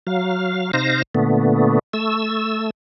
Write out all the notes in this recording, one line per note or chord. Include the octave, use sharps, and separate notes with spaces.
F#3 F5
C3 D#4 C5 F5 A#6
A#2 D3 A3 B3
A3 E6